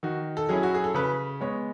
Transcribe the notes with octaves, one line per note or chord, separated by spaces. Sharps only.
D#3 F#4
A4
F#3 C#4 E4 G#4
F#4
G#4
A4
C#3 B4
G#3 B3 C#5